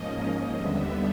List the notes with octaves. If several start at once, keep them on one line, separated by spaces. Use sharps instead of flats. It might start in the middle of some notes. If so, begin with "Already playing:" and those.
Already playing: G#2 F3 A#3 C#4 D#5
D#2 D3 G3 B3 E5